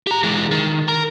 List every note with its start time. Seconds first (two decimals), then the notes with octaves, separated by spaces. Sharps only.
0.07 G4 A#5
0.23 E3 G#3
0.51 D#3
0.88 A#4